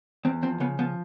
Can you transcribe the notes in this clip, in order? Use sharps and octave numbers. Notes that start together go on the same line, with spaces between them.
E2 C4
F3 C4
C#3 B3
F3 B3